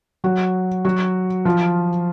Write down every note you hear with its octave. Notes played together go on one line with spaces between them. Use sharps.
F#3 F#4
F#3 F#4
F3 F4